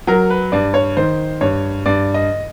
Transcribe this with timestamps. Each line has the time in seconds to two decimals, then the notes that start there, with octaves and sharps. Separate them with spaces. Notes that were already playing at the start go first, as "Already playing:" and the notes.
0.07 F#3 A#4
0.30 B4
0.52 G2 D5
0.74 C#5
0.97 D#3 C5
1.41 G2 C#5
1.86 G2 D5
2.14 D#5